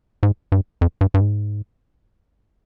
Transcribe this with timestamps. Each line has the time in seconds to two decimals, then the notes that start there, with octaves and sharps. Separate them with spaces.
0.23 G#2
0.52 G2
0.81 F2
1.01 G2
1.14 G2
1.21 G#2